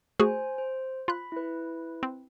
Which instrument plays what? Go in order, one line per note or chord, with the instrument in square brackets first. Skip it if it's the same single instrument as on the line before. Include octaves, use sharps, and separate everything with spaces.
[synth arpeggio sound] A3 F#4 G#4 [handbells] C5 G#5
[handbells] C5
[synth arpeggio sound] F4 F#6 [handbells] B5
[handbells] E4 B4
[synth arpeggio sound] C4